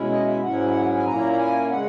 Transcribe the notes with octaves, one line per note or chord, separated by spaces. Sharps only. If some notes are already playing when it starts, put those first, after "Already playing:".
Already playing: B2 G#3 C#4 E4
D#5
E5
G#2 F#3 C#4 E4 F#5
G#5
A#2 A#3 C#4 E4 A#5
A#5
G#5
C#3 G#3 F#5